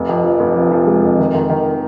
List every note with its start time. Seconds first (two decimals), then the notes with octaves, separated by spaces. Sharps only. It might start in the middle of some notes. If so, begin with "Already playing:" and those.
Already playing: F1
0.09 F2
0.24 F3
0.40 F1
0.56 F3
0.72 F3
0.87 G#3
1.03 F2
1.19 D#3
1.34 D#3
1.50 D#3